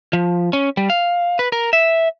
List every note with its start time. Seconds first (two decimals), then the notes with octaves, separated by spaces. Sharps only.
0.13 F3
0.53 C#4
0.77 G3
0.90 F5
1.39 B4
1.52 A#4
1.73 E5